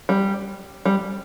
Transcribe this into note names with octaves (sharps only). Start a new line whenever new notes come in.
G3
G3